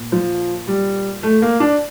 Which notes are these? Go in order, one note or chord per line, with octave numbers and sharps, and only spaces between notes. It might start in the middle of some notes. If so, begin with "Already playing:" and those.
Already playing: A#2
F3
G3
A3
A#3
D4